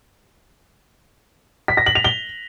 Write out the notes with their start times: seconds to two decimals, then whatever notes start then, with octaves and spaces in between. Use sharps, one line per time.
1.68 B6
1.77 A#6
1.86 F#7
1.95 F7
2.04 G7